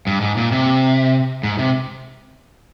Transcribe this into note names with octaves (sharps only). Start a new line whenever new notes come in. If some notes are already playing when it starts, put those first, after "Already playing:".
G2
G#2
A#2
C3
G#2
C3